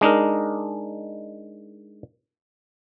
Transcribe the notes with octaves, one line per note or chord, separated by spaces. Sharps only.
G#3 D4 D#4 A#4